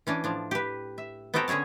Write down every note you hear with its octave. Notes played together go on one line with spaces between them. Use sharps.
E3 C#4 D4
A2 F3 D4
G4 B4
E5
B3 C4 F#4 A4 G5 A#5
D3 C#4 G#4 C#5 A5